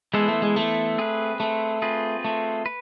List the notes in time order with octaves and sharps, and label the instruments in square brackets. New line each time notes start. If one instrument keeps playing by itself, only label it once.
[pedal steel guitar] E3 B3 E4 A4 C5 [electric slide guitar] G#3
[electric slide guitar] A3
G#3
A3
[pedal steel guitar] C4 G#4 B4
[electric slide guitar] A3
[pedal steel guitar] C4 F4 G#4 B4
[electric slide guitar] A3
[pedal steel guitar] B4